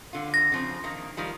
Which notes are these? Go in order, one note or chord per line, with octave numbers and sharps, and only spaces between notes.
D3 F4
A#6
C#3 F3 C4
D#3 A#3
D#3 F3 G3